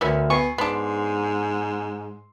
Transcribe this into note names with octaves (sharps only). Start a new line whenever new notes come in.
D2 B3 C#4 A#4 E6
B3 G#5 C#6 C7
G#2 B3 D4 C6